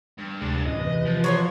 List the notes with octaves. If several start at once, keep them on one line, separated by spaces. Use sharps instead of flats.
G2
D2 C3 G#3 D4 A6
E2 A2 C#4 D#5
C3 E3 B4
F3
F#3 C5 C#5